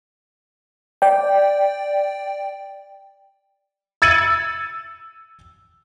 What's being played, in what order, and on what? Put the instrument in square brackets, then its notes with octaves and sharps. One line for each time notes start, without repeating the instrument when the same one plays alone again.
[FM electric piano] D5 G5
[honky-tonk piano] E6 G#6 A6 C#7 D#7 F#7